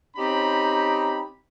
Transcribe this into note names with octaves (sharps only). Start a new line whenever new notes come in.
C4 C#4 D#4 G4 A#5 B5